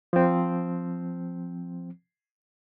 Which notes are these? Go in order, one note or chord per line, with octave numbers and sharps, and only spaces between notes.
F3 C4